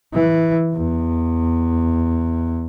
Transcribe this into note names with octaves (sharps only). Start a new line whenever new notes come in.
E3
E2